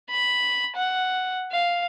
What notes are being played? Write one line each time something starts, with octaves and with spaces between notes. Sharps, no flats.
B5
F#5
F5